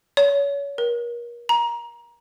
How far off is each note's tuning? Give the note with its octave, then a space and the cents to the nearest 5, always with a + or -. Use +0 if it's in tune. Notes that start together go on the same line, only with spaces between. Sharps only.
C#5 +25
A#4 +35
A#5 +20